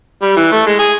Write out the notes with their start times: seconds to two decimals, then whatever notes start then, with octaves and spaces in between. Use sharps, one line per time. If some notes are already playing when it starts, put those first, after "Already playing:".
0.23 G3
0.37 E3
0.52 A3
0.66 G#3
0.79 G#4